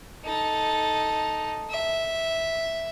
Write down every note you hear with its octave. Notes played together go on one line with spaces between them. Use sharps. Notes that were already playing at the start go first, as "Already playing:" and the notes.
D#4 A4
E5